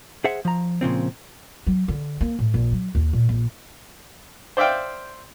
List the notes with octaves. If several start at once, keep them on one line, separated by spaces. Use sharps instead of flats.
G#4 C5 E5 F#5
F3 A#5
A#2 C#3 F3 C4
F#3
D3
A#3
A2
A#1
F#3
D#2
A#2
A#1
C5 D5 E5 F5 G5